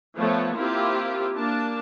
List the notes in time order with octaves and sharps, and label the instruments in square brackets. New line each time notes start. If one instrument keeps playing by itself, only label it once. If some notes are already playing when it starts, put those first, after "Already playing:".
[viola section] F3 A3 B3 C#5
A#3 C4 E4 F4 G4
A#3 D4 A5